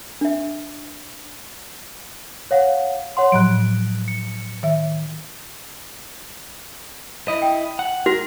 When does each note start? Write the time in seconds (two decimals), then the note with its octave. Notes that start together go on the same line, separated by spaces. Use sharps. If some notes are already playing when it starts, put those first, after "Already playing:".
0.21 D4 E5
2.51 C#5 F5 F#5
3.17 C#5 F#5 C6
3.32 A2 F3 F#3 F#6 D7
4.08 C#7
4.63 D#3 E5
7.28 E4 D#5
7.42 G5
7.79 F#5
8.06 F#4 A#4